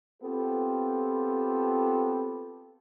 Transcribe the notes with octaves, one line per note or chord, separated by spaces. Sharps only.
B3 C4 F4 G4 A4